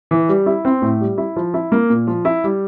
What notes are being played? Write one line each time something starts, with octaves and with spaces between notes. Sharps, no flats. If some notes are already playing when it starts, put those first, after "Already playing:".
E3
G3
E4
C4
A2
G3
E4
F3
E4
A#3
A#2
F3
E4
G3